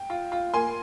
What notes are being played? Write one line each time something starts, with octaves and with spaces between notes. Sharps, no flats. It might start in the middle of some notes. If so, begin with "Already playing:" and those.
Already playing: G5
F4
F4
A#3 G#5 C6